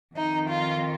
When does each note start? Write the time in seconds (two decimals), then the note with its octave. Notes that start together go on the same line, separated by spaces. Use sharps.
0.15 F2 D#3 D#4
0.50 F4